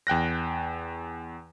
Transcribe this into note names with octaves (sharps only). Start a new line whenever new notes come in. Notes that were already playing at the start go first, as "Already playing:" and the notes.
E2 G5 F#6 A#6